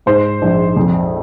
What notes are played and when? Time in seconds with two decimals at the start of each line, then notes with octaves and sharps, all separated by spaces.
0.06 G#2 C5
0.42 A#1
0.76 F2